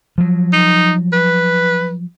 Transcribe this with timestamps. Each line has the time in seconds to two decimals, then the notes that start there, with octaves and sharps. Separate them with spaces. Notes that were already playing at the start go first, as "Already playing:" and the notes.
0.18 F3 F#3
0.53 D#4
1.13 B4